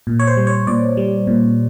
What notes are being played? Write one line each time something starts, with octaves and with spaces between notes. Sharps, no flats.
A#2
C#5
C5
G3
C#5
A#2 D5
G3
A#2